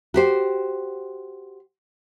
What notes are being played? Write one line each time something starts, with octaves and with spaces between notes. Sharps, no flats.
F#4 G4 C5